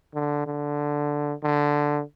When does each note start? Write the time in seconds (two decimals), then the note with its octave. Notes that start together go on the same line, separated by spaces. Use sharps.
0.15 D3
0.47 D3
1.44 D3